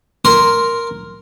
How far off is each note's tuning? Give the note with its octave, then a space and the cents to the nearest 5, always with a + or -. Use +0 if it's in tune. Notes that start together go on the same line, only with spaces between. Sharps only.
A#4 +0 C6 +0